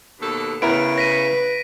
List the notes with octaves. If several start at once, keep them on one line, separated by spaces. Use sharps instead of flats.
D#2 B2 A4
A2 C#3 B3 E4 A#4 D7
B4 A#6 B6 D#7